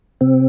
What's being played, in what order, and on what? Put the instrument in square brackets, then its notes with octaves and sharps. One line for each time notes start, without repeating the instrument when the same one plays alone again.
[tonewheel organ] C3 C4